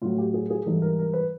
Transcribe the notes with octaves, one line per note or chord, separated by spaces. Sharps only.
A2 F#3 F4
G4
G#4
G#4
G#2 E3 G3 A4
A#4
A#4
B4